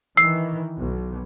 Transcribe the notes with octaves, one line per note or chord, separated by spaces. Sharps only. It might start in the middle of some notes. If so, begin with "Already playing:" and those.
D#3 E3 E6 C7
B1